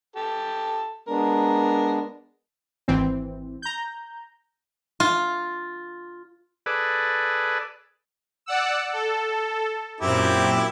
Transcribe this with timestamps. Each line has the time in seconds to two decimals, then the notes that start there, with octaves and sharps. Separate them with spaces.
0.16 G4 A4
1.08 G#3 B3 D4 A#4
2.88 G#1 E3 C4
3.62 A#5 G6
5.00 F4
6.66 G#4 A4 B4 D5
8.46 D5 F#5 E6
8.93 A4
10.01 F#2 A#2 C4 E4 G4